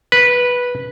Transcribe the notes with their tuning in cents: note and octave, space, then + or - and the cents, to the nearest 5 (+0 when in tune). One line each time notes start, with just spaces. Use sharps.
B4 -10